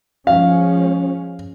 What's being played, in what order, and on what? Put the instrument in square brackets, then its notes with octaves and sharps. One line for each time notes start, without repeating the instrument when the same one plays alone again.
[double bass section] F3 G#3 C#4 [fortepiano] F5